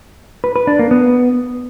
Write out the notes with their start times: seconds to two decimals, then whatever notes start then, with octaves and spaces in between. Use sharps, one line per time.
0.44 B4
0.56 B4
0.67 D4
0.79 A#3
0.91 B3